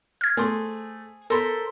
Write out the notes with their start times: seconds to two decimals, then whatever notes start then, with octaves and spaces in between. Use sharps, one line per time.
0.21 F6 G#6
0.37 A3 G#4 C5 D6
1.30 A4 A#4 C5 B5